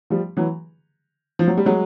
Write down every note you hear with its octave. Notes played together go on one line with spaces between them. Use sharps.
F3 G3
E3 F#3
F3
F#3
G3
F#3 G#3